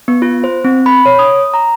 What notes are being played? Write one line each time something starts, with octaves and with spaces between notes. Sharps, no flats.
B3
F4
C5
C4
B5
C#5
D#6
A#5